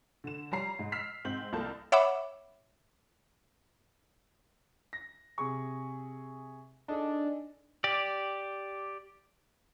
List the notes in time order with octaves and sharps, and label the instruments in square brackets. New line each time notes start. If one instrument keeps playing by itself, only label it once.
[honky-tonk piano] D3 E7
G3 C#5 A#5 C7
G#2
E6 F6 B6 C7
G#2 C4 G6 F#7
C2 A#3 A4 A5 G6
[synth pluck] C#5 E5 F#5 B5 D6
[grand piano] A#6
C3 G#4 C#6
[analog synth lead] D4 [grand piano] D#4 G#4 A4
[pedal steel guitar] G4 D5